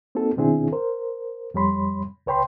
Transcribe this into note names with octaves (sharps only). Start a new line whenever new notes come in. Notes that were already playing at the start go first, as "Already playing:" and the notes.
A#3 C4 D#4 F#4 A4
B2 D#3 C4 D4 E4 G#4
A#4 C5
F2 G3 C#5 B5 C6
C#2 B4 C#5 G5 B5 C6